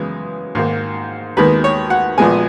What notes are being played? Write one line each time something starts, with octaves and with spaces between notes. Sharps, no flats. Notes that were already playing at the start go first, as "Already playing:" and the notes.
Already playing: F#2 C#3 E3 G#3 B3
G#2 D#3 A#3
D#2 D#3 G#3 B3 B4
C#5
F#5
A#1 A#2 G#3 B3 G#5